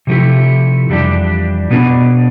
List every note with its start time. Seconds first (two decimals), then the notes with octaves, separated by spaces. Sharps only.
0.07 C3 F3 A3 E4 G4
0.89 F2 E3 G3 D4 G4
1.71 B2 B3 D4